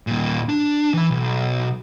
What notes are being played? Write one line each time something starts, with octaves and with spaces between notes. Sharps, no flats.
D#2 A#2
D4
E3 B5
B1